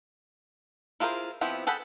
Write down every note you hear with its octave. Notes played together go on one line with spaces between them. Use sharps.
E4 F4 G#4 A#4 C5
F3 B3 C4 E4 G4
G#4 A4 F#5 G5 B5